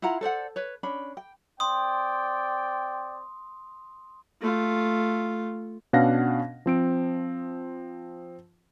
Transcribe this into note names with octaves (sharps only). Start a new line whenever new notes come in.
E4 F4 F#5 A#5
A4 C5 D5 F#5
B4 C#5
C#4 D4 B5
G5
C4 D5 G5 C6 D#6
A3 F4
B2 C#4 D4 F5 F#5 A#6
F3 C4 D7